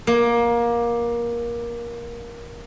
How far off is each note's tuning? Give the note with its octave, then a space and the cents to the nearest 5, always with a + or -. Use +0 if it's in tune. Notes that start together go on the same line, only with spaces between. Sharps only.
A#3 +20